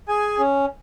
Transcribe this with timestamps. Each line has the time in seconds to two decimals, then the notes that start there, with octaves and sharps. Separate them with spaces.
0.08 G#4 G#5
0.39 C#4